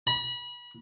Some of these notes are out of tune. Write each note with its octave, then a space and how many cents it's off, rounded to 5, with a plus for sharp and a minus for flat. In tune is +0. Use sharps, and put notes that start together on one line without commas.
B5 -30